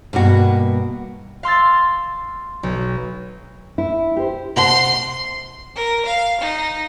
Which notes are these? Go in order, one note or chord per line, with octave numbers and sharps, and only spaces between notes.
G2 B2 A#3 F#4
F5 C6 E6 A6
B1
E4
G4 C5
C3 F#5 A5 C6
A#4
F5
D#4